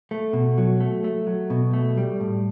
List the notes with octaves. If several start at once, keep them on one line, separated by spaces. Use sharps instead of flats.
A3
B2
F#3
A3
A3
F#3
B2
A3
G3
A2